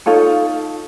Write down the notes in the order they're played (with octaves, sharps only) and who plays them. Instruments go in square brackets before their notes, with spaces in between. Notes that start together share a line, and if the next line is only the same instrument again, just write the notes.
[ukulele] D#4 F4 A4 C#5